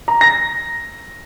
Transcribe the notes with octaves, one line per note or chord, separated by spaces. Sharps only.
A#5
A#6